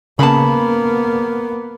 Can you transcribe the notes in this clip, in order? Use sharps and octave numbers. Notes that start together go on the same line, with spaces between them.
C#3 A#3 B3 A5 B5